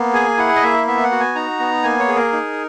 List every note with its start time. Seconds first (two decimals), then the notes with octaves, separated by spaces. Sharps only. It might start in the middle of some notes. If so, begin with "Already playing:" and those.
Already playing: A#3 B3
0.14 G#4 G#5
0.38 E4 F#5
0.56 D#5
0.62 A#3 E5
0.87 B3 E5
1.04 F#5
1.12 F#4
1.20 G#5
1.35 D#4 A#5
1.60 B3
1.83 A#3 G#5
1.99 C#5
2.08 G#4
2.15 A#4
2.33 D#4